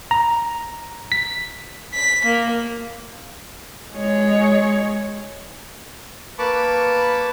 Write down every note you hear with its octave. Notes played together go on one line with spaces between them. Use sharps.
A#5
B6
B6
A#3
G#3 C#5
A#3 B4 A5 B5 C#6 D6